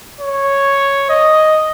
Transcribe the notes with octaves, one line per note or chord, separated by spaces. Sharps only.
C#5
D#5